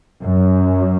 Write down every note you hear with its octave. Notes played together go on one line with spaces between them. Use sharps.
F#2